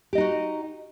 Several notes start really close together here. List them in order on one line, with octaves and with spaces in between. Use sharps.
G4 D#5 D#4 F#4